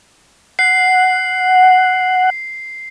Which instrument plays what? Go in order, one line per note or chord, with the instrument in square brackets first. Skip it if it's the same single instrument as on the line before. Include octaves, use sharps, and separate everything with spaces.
[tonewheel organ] F#5 [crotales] C7